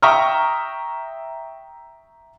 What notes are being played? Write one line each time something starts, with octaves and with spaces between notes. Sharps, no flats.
E5 G5 A#5 C#6 D#6 F6